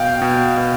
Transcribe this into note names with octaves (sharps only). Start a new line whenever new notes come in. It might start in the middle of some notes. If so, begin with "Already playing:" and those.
Already playing: B2 F5 G5
B2
B2